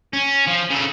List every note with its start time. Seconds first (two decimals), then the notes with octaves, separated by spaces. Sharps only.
0.13 C#4
0.47 F3
0.70 C#3 A4